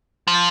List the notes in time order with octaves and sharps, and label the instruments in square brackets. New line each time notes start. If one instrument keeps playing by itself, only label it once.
[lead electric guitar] F3